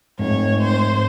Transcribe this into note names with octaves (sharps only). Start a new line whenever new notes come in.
F1 G#2 C#5
C5